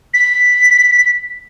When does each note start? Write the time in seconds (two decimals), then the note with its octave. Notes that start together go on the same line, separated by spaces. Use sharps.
0.14 B6